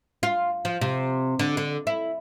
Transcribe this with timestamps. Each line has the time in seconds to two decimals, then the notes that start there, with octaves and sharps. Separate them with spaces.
0.23 F4
0.65 F3
0.81 C3
1.39 D3
1.57 D3
1.87 E4